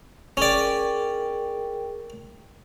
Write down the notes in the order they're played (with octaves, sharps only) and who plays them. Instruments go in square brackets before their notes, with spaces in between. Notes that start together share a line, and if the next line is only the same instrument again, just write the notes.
[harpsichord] C#4 D5 [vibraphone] G#4 A#4 G5